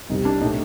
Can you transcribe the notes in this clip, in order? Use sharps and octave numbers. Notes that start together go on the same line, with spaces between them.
C2 C3 G3 D#4
D4
A2 A3 D#4